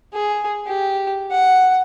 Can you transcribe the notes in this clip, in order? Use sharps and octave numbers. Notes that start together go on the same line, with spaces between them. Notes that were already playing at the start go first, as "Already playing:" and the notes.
G#4
G4
F#5